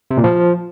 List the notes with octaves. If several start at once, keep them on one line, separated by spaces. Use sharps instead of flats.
C3
A#2
F3